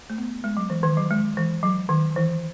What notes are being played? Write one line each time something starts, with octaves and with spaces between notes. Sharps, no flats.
A3
B3
G#3
F#3
E3
D#3
F#3
G#3
E3
F#3
D#3
E3